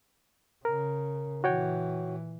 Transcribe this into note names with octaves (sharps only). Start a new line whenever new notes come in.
C#3 A#4
A#2 E3 F#4 C#5 G5